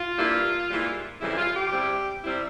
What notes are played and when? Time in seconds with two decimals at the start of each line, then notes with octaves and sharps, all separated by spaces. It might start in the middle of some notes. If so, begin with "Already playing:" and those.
Already playing: F4
0.18 G2 G3 A#3 E4
0.69 G#2 E3 G3 A#3 E4
1.21 F2 C#3 E3 G3 E4
1.38 F4
1.55 G4
1.72 E2 C3 G3 C4 E4
2.23 C3 G3 C4 E4